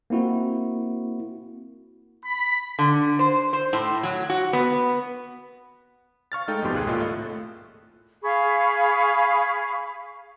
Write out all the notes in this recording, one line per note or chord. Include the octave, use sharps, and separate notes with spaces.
A#3 C4 E4 F#4
B5
D3
C5
C5
A2
F#3
F#4
B3
F5 C#6 F6 A6
G#3 A3 D#4 A4 G5
G#1 F2 B2 G4 C6
C#2 G#4 F#6
G#1 A2 A#3 F4 A4 D#5
A3
G#4 F5 B5 C#6